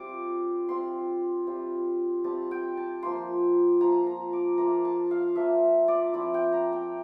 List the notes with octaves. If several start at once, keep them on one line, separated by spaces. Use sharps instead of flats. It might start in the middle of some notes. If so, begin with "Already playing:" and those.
Already playing: G3 C4 F4 D6
G3 C4 F4 C6
G3 C4 F4
G3 C4 F4 A5
G5
A5
F3 A#3 F4 C6
F3 A#3 F4 A#5
A#5
D6
F3 A#3 F4 A#5
A5
F5
F3 A#3 F4 E5
D5
F3 C4 E4 D5
G5
A#5
G5